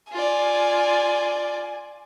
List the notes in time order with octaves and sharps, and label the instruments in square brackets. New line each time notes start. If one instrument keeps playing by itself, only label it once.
[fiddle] F4 D5 [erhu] G#5